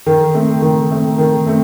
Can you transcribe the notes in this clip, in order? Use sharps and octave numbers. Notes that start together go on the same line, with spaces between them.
D#3
A3 C4
D#3
A3 C4
D#3
A3 C4